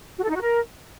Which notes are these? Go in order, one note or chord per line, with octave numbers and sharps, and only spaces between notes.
F#4
A4
D#4
F#4
A#4